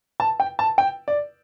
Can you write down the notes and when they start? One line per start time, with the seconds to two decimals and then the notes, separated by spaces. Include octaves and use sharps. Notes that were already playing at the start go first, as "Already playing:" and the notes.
0.20 A5
0.40 G5
0.59 A5
0.78 G5
1.08 D5